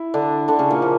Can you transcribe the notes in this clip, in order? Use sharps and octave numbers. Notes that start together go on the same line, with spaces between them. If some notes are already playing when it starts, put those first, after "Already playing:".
Already playing: E4
D3 D4
D3 D4
C#3 C#4
A#2 A#3
F3